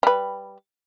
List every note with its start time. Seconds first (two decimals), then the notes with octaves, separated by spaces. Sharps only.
0.03 G3 B4